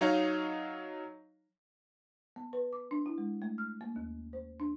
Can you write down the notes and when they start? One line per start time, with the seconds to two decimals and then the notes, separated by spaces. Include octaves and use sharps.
0.01 F#3 D#4 C#5 D#5 F5
2.36 B3
2.53 B4
2.73 D6
2.91 D4
3.06 E4
3.18 G#3
3.42 A3
3.58 F6
3.81 A#3
3.96 D#2
4.33 C5
4.60 D4